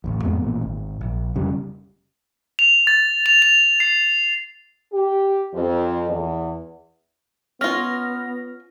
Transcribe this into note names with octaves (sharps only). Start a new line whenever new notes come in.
D1 A1 D#2
F2 G#2 B3
A1 A#2
G#1
A#1
F1 C#3 G3
F7
A6
F7
F7
C7
G4
F2
E2
B3 C#4 F4 F6 A#6